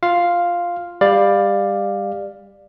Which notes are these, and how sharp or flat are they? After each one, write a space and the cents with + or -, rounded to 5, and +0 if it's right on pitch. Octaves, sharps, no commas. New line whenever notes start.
F4 +0 F5 +0
G3 +20 D5 +10 F5 +0